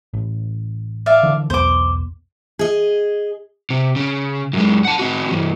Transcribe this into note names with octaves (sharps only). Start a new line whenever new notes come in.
A1
D5 E5 F5
D3 E3 F3
B1 E2 B3 C5 D6
G#4 D#5
C3
C#3
F#2 G#3
F#5 A5
C4 F#4
G2 E3